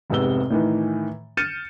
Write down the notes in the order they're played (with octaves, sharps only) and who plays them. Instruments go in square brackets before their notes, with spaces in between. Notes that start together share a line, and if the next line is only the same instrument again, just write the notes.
[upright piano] F1 G#2 C3 B3 E6 G7
A2 D#3 E3
F6 G6 A6 C#7 D#7 E7